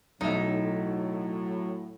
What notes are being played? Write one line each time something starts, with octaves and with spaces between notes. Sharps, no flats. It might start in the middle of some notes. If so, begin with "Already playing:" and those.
B1 A2 F#3 D#4 E5